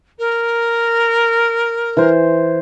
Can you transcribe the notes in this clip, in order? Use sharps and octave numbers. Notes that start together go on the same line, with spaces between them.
A#4
E3 C5